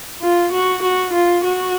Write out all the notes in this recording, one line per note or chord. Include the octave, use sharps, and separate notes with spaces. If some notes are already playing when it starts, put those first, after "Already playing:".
F4
F#4
F#4
F4
F#4